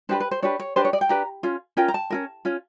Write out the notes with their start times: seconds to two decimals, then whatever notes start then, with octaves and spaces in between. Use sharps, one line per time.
0.09 D4 G4 B4 C5
0.20 B4
0.31 C5
0.42 D4 G4 B4 C#5
0.60 C#5
0.76 D4 G4 B4 C5
0.85 C#5
0.93 D5
1.01 G5
1.09 D4 G4 B4 A#5
1.43 C#4 F4
1.77 C#4 F4 A#4 G5
1.88 A#5
1.94 A5
2.10 C#4 F4 A#4
2.45 C#4 F4